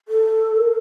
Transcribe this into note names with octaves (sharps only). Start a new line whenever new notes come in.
A4
A#4